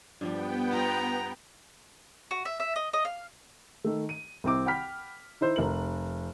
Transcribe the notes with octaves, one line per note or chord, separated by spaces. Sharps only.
G2 F3 G3 B3 G5
F4 A#5
F#4
E5
E5
D#5
D#5
F5
D#3 A3
D#7
C2 C4 D6
F#5 G5 B5 F6 B6
D#4 E4 C5
F1 A#4 F#7